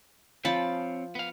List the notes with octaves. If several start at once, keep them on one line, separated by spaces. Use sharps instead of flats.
F3 C4 C#5 A5 B5
B3 F5